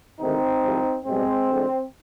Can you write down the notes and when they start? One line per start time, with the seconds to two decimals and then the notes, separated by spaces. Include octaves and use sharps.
0.20 D2 C3 D#3 G#3 C4 D#4
0.63 C2 C3 F3 G#3
1.06 B1 B2 G3 G#3 C4
1.49 D2 D3 F3 G#3